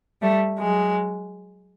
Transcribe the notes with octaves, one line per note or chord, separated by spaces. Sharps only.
G3 A3
F#3 G#3